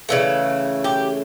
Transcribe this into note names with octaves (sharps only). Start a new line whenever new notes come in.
C#3 E3 A3
G4